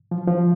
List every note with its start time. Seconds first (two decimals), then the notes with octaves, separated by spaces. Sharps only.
0.11 F3
0.28 F3